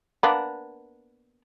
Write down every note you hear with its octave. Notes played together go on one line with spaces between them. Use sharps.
A#3 B3 D4